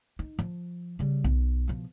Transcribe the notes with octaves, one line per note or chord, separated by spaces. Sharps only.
D#4
F3
C#3 G3
B1
B2 F3